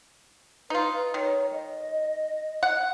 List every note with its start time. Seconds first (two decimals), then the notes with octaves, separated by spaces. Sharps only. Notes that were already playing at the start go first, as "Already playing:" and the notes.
0.70 D#4 F4 B4
1.14 D#3 C#5
1.53 D#5
2.63 F#5